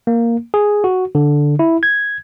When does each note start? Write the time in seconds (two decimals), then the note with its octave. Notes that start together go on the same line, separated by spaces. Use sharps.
0.07 A#3
0.54 G#4
0.84 F#4
1.15 D3
1.59 E4
1.83 G#6